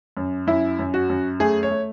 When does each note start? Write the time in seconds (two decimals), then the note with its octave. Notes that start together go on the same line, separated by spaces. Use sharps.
0.17 F#2
0.47 F#2 E4
0.79 F#2
0.94 F#4
1.09 F#2
1.40 A3 G#4
1.63 C#5
1.71 A3